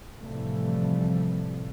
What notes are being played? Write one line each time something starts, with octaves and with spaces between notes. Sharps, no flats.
A2 C3 E3 F3 G3 A3